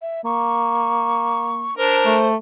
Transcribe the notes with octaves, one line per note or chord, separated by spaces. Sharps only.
E5
A#3 C#6
D4 A#4 C5
A3